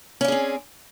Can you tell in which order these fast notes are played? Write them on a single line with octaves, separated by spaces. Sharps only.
C#4 D5 G#4 C4